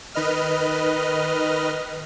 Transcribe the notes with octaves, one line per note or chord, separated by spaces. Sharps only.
D#3 B4 D#5 F6